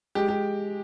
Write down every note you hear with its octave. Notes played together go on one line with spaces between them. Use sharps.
G#3 G4
G4